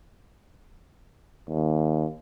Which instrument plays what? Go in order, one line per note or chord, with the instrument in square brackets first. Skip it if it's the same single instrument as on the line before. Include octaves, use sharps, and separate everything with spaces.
[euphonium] D#2